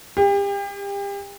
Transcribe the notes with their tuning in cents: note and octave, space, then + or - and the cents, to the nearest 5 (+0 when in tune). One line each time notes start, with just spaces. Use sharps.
G4 +35